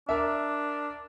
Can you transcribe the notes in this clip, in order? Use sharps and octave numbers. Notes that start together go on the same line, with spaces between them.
D4 A#4 E5